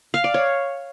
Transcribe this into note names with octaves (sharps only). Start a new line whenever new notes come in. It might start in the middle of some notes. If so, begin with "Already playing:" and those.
F5
D5
C#5